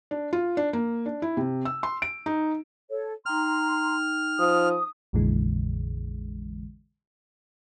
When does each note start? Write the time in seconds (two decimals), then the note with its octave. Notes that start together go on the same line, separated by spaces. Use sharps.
0.11 D4
0.33 F4
0.57 D4
0.73 A#3
1.06 D4
1.22 E4
1.37 C3
1.65 E6
1.83 C6
2.02 D7
2.26 D#4
2.90 A4 C#5
3.26 D#4 G5 A#5 C6 F6
4.39 F3 D#6
5.13 A#1 F2 A#2 D3 E3 G#3